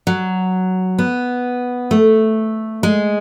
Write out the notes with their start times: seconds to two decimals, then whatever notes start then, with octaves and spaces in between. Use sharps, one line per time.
0.07 F#3
0.99 B3
1.91 A3
2.83 G#3